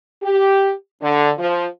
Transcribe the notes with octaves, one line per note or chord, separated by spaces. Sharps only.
G4
D3
F3